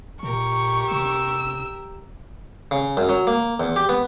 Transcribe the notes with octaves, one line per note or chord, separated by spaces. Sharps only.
A#2 G4 A#4 C#6
C3 E6
C#3
F#2
F#3
A#3
E2
G4
B3